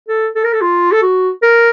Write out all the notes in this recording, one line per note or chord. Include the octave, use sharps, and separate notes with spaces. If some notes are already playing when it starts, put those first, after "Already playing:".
A4
A4
A#4
A4
F4
A4
F#4
A#4